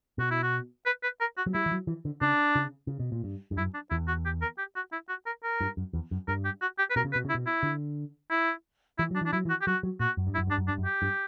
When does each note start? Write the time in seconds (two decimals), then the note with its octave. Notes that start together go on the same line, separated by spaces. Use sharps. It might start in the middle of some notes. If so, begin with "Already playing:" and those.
0.18 B2 F#4
0.31 E4
0.43 F#4
0.86 B4
1.03 B4
1.20 A#4
1.37 F#4
1.46 F#3
1.54 G3 E4
1.66 E3
1.72 F#3
1.87 E3
2.05 D3
2.21 C#3 D4
2.55 C#3
2.87 C#3
3.00 B2
3.12 A#2
3.24 G2
3.51 G2
3.57 F#2 E4
3.74 D4
3.90 E2 E4
4.08 F#4
4.25 G4
4.42 A#4
4.58 G4
4.76 F#4
4.92 E4
5.09 F#4
5.26 A#4
5.43 A#4
5.61 G2
5.77 F#2
5.93 E2
6.11 F#2
6.28 G2 A#4
6.45 G4
6.61 F#4
6.79 G4
6.90 B4
6.96 B2 A#4
7.05 C#3
7.13 B4
7.15 B2
7.25 C#3
7.29 E4
7.35 B2
7.46 E4
7.63 D3
8.31 E4
8.98 E3 E4
9.11 F#3 D4
9.21 E3 D4
9.33 F#3 E4
9.45 E3
9.50 F#4
9.61 G4
9.67 F#3 F#4
9.83 F#3
10.00 A#2 F#4
10.17 F#2
10.27 G2
10.34 E4
10.38 F#2
10.47 G2 D4
10.57 F#2
10.68 G2 D4
10.78 F#2
10.85 G4
11.02 G2